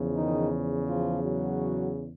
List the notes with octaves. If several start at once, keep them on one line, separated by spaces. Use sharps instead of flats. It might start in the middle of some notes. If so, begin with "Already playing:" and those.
Already playing: E2 C#3 F3
D#3 D#4
F3 F4
F#3 F#4